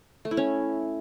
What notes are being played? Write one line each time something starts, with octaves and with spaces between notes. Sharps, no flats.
A3
E4
C#4